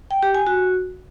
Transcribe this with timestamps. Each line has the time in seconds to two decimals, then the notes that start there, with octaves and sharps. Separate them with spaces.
0.11 G5
0.23 G4
0.35 G#5
0.47 F#4